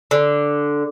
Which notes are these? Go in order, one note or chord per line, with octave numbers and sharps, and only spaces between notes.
D3